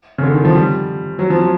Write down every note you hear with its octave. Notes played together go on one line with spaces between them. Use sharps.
C#3
D3
D#3
F3
G3
F#3
F3
F#3